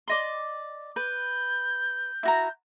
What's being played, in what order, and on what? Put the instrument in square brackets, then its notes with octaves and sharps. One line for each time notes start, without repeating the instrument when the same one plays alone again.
[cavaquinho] D5 D#5 C6
[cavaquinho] B4 [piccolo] G6
[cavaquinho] E4 F#4 A#5